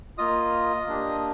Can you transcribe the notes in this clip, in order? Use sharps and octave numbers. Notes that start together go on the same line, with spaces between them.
A#3 F4 D#5 D#6
A#3 D4 G4